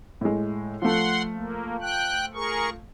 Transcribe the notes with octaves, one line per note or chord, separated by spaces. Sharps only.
A2 G#3
F3 A3 F#5 C6
A#3
G5 F#6
G#4 A#4 C#6